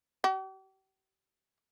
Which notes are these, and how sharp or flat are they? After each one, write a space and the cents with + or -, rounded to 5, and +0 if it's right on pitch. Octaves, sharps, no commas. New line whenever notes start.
G4 -40